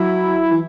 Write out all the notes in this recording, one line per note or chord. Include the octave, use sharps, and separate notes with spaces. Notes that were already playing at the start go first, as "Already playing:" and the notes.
Already playing: F#3 E4
E3